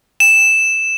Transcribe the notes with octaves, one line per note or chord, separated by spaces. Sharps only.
E7